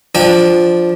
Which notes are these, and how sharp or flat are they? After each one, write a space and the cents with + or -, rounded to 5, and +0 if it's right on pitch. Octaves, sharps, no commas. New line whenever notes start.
F3 +0 D4 +0 G5 +25